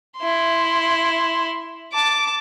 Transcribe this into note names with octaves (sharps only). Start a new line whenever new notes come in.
E4 C6
A5 D6